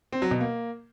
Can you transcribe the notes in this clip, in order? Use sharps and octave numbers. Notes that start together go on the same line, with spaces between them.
C4
F#3
B2
A#3